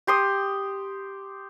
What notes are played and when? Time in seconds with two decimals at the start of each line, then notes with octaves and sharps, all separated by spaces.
0.07 G4 C6 D#6